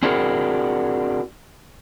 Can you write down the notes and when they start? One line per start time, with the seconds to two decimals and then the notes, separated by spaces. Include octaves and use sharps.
0.03 C4 D4 E4 F#4 G#4 A#4